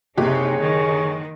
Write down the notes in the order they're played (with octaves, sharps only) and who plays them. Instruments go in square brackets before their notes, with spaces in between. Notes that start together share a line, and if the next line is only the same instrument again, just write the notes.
[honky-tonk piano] F#1 G4 [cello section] C3 D#4 [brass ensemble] G#4 C#5
[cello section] D#3